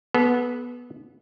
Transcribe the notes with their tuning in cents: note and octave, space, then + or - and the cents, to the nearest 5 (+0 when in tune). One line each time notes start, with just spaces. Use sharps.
B3 -10 A4 -40